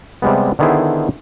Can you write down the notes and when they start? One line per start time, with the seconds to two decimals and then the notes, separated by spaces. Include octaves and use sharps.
0.22 C3 G3 G#3 B3
0.59 D3 D#3 B3 E4 G#4 C5